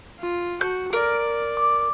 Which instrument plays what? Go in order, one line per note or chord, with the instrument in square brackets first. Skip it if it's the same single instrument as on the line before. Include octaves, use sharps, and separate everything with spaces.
[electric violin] F4
[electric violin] F#4 [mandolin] G6
[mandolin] A#4 [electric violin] D5
[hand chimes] D6